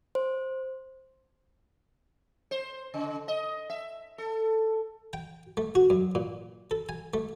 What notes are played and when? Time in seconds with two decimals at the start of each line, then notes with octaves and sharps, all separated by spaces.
0.15 C5
2.51 C5
2.94 C#3
3.28 D#5
3.70 E5
4.18 A4
5.13 G5
5.57 A3
5.75 F#4
5.90 F#2
6.15 A#2
6.71 A4
6.89 G#5
7.14 A3